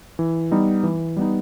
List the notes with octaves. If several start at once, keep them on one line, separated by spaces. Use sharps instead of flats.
E3
G3 B3 D#4
E3
G3 B3 D#4